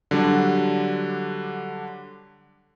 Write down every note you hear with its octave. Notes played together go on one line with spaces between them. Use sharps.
D3 F#3 G3 D4